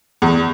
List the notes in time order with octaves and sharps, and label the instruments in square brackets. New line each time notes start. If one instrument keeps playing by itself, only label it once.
[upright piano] E2